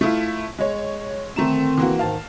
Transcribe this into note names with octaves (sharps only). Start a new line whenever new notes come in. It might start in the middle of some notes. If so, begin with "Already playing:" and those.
A3 E4 F4
G#3 C#5
D3 D#3 A3 C4 A#5 E7
E3 A#3 F#4
G#2 D#3 F5 A5